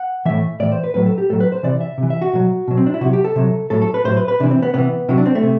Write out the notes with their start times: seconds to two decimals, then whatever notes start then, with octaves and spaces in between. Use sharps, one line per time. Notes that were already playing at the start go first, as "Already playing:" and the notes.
Already playing: F#5
0.25 A2 E3 E5
0.60 A2 E3 D5
0.72 C5
0.84 B4
0.94 A2 F#3 B4
1.06 A4
1.18 G4
1.30 A2 F#3 A4
1.40 B4
1.52 C5
1.63 C3 E3 D5
1.81 E5
1.98 C3
2.03 E3
2.10 E5
2.22 F#4
2.33 B2 F#3
2.68 B2 F#3
2.77 C4
2.86 D4
2.94 E4
3.01 C3 F#3 F#4
3.13 G4
3.24 A4
3.36 C3 F#3
3.70 A2 F#3 A4
3.82 A4
3.94 B4
4.05 A2 F#3 C5
4.17 B4
4.28 B4
4.40 C3 E3 D4
4.51 C4
4.62 B3
4.74 C3 E3 B3
5.09 C3 F#3 E4
5.18 D4
5.26 C4
5.35 A3
5.43 C3